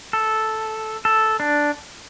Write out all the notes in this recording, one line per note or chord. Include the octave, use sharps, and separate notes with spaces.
A4
A4
D4